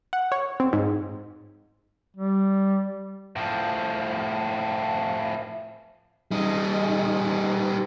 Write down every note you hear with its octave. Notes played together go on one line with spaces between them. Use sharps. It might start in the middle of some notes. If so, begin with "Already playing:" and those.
F#5
C#5
C4
G#2
G3
A2 F3
G3 D#4